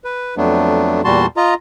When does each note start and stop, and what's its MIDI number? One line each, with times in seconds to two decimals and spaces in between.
0.04 0.35 71
0.37 1.01 41
0.37 1.01 54
0.37 1.01 57
0.37 1.01 59
0.37 1.01 62
1.04 1.26 40
1.04 1.26 46
1.04 1.26 55
1.04 1.26 66
1.04 1.26 81
1.04 1.26 84
1.37 1.54 65
1.37 1.54 75
1.37 1.54 82